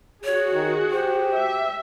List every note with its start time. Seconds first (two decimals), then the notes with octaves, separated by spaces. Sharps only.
0.24 F#4 G#4 C#5
0.53 D#3
0.91 G4 C5
1.34 E5